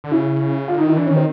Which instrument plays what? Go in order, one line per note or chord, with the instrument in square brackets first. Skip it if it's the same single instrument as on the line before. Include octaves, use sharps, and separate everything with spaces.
[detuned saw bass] D3
[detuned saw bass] C#3 [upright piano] E4
[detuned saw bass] D3 [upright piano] F4
[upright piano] D#4
[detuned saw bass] D#3 [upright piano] E4
[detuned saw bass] E3 [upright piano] D4
[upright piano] C#4
[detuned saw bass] D#3
[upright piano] C4